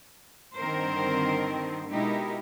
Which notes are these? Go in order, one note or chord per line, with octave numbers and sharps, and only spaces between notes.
G2 D3 D#3 C4 A#4 C5
B2 G#3 D#4 E4 G4 A#4